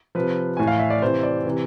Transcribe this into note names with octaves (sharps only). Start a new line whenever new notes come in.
C3 F3 B4
A2 E3 G#5
F5
E5
D5
C3 E3 C5
D5
C3 E3